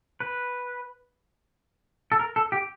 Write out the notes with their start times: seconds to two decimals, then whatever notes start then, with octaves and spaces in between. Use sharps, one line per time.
0.20 B4
2.12 A4
2.19 A#4
2.36 A4
2.52 G4